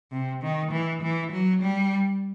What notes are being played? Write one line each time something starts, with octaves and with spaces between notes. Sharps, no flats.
C3
D#3
E3
E3
F#3
G3